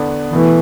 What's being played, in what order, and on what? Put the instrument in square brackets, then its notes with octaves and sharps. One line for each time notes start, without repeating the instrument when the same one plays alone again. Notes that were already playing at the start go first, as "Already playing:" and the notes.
Already playing: [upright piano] E2 D3 B3 D4
[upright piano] E2 B2 A3 [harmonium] E3